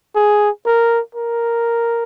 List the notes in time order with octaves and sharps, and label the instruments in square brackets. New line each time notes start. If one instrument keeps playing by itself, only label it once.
[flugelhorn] G#4
A#4
A#4